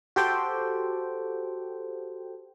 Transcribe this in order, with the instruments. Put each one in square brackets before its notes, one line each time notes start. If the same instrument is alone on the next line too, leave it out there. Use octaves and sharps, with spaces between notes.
[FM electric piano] F#4 G4 A4 C5 G5